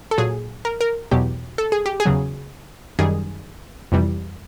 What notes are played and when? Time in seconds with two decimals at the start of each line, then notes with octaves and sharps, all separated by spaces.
0.11 A4
0.18 A#2 F#3 G#4
0.65 A#4
0.81 A#4
1.11 E2 B2 F#3 G4
1.58 A4
1.72 G#4
1.86 G4
2.00 G#4
2.05 E2 C#3 F#3
2.99 F#2 D#3 G3 G#4
3.92 F2 C3 E3 G3